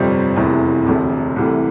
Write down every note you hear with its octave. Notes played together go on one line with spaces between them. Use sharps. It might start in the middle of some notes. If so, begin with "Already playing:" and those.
Already playing: G1 F2 C3 G3 C4
F1 E2 C3 E3
E1 D2 C3
C2 C3 E3 A3